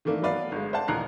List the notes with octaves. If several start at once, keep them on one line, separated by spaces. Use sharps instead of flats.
D#3 E3 A3 A#3 D4
F#3 A3 B3 B4 D5 F5
G1 G#3
C5 D5 F5 F#5 A5
D#1 A1 A#2 A#5 F#6 C7